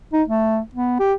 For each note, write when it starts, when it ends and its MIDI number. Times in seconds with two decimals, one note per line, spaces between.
0.13 0.23 63
0.28 0.59 57
0.75 0.99 59
1.00 1.13 67